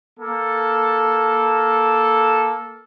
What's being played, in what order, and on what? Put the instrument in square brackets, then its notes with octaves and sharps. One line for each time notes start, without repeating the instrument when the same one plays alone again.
[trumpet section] A#3 A4